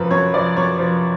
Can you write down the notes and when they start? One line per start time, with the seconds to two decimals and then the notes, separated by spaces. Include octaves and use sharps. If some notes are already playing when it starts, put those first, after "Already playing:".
Already playing: F#2 F3 B4
0.11 F#2 C#5
0.34 F3 D5
0.56 F#2 C#5
0.79 F3